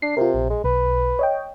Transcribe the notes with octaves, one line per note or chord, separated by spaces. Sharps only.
D4 C7
C3 F4 A#4
A#1
G#3
B1 B4
C#5 D#5 G5